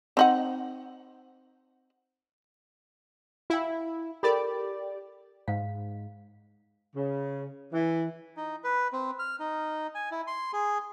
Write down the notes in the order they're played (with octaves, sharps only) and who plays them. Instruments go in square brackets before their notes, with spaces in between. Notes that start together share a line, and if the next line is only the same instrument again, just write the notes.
[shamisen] C4 D#4 F#5
[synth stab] E4 [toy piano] F5 G5
[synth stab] G4 D5 [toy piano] A4 A#4 B5
[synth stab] G#2 [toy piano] F5
[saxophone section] C#3
E3
[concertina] D#4
B4
C4
F6
D#4
G#5
E4
C6
G#4